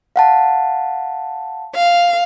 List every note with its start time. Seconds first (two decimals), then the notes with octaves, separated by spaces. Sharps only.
0.16 F5 F#5 A5
1.75 F5